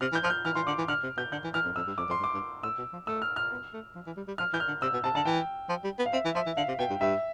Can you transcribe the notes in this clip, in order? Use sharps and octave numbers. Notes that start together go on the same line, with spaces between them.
C3 F6
E3
G6
F3 F6
G6
E3 F6
E3 C6
D3 D6
E3
D3 F6
C3
B2 G6
D3 G6
E3
E3 F6
F2
F2 E6
G2
F2 D6
F2 C6
G2
D6
G2
A2 E6
B2
F3
A3 E6
F6
F6
B3
A3
F3
E3
G3
G3
F3 F6
E3 G6
F6
D3
C3 E6
B2
C3 A5
D3 A5
E3 G5
F3
G3
B3
F5
C4 E5
E3
F3 E5
E3
D3 F5
C3
B2 G5
G2
G2 E5